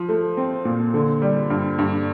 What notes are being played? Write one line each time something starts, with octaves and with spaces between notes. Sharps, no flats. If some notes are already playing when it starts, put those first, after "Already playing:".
Already playing: F3
A3
C4
A#2
D3
G3
G2
G2